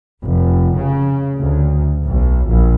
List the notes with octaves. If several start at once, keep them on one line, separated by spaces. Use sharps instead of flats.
F1
C#3
D2
B1
A#1